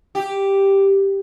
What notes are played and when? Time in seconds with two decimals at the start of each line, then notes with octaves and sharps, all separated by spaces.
0.15 G4